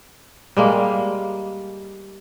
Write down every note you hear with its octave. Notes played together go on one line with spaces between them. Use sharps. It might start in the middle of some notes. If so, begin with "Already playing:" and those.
G3 G#3 A#3